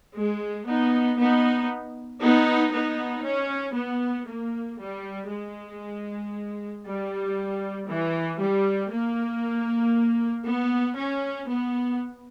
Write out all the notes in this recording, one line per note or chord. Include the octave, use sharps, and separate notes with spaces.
G#3
B3 D#4
B3 D#4
B3 D#4
B3 D#4
C#4
B3
A#3
G3
G#3
G3
E3
G3
A#3
B3
C#4
B3